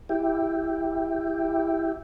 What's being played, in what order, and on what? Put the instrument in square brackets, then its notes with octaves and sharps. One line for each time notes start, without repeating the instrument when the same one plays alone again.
[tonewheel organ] E4 G4